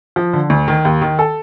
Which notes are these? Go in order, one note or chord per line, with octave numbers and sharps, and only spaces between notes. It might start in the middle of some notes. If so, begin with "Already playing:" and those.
F3
D3
D2
D#3
D#2
D#3
A4